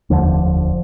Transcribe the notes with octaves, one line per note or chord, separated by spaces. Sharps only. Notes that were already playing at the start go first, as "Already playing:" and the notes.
F1 D#2 D3 F3